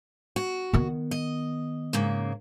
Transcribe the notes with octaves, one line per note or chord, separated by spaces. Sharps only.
F#4
D#3 B3
D#5
G#2 C#3 A#3